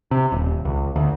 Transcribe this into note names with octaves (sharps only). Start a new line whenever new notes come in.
C3
D#1
C#2
D2